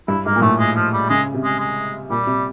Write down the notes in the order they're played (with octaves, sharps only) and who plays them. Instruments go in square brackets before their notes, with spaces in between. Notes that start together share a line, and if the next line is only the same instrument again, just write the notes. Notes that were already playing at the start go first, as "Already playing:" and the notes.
[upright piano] G2 [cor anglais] E4
[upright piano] G#2 [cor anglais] A#3
[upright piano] A#2
[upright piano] A2 [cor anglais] A3
[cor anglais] G#3
F3
G3
[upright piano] C#3 [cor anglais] G#3
[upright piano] C3
[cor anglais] G#3
G#3
[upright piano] A#2 [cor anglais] G3
[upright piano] C3